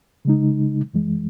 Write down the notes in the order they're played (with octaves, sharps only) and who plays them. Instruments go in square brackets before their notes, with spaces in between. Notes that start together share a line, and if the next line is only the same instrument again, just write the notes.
[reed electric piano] C#3 G#3 D#4
F#2 E3 G#3